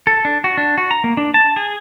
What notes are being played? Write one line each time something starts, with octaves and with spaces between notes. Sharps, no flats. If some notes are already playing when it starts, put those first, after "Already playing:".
A4
D4
F#4
D4
F#4
A#5
A#3
D4
A5
G#4